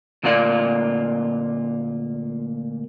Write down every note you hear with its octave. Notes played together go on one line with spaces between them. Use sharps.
D2 A#2 A#3 F4 D5